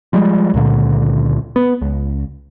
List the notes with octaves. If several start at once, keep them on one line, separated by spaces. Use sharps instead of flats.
F3 G3 G#3
C#2 A#2 D3
B3
C#2